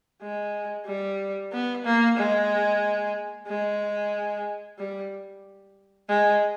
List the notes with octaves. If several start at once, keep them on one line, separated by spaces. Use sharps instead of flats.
G#3
G3
B3
A#3
G#3
G#3
G3
G#3